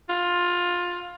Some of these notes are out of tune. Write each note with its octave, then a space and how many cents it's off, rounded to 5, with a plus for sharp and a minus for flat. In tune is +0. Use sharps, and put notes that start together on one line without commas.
F4 +15